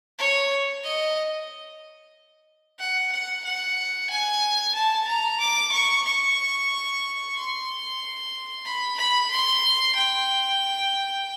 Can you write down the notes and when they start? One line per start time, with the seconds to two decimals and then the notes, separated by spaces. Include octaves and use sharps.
0.18 C#5
0.84 D#5
2.79 F#5
3.12 F#5
3.44 F#5
4.10 G#5
4.75 A5
5.07 A#5
5.40 D6
5.72 C#6
6.05 C#6
7.35 C6
8.65 B5
8.98 B5
9.30 C6
9.95 G5